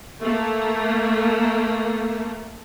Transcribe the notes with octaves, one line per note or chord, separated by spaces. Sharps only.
A3 A#3